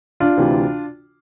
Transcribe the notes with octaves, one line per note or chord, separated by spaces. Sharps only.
D4 F4
D2 C3 E3